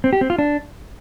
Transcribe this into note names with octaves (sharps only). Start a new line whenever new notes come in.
C4
G4
C4
F4
D4